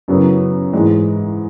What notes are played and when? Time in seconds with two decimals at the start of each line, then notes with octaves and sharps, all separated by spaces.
0.08 F#2 C#3 F#3 B3 E4
0.73 G#2 E3 G#3